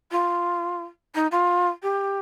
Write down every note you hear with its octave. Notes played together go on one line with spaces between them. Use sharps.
F4
D#4
F4
G4